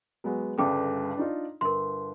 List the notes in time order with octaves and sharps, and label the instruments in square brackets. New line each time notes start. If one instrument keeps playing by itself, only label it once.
[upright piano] F#3 G#3 B3
[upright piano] G1 G2 C#3 [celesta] A4 G5 D6
[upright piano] D4 D#4 F4
[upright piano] G1 [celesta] A#4 C6